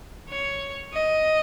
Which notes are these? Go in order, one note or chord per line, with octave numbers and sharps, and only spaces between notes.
C#5
D#5